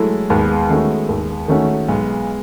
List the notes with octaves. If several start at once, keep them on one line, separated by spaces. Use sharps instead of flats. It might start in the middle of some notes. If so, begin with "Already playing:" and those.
Already playing: E3 F#3 G#3 A3 E4 A4
D#2 G#3 B3
D#3 A3 C#4 F#4
D#2
D#3 A3 C#4 F#4
B1 G#3 B3